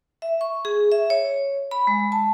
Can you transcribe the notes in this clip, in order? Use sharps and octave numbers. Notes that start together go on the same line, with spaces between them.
E5
C#6
G#4
E5
C#5
B5
G#3
A5